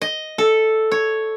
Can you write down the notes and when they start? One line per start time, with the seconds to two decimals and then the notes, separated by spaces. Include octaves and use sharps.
0.01 D#5
0.38 A4
0.91 C#5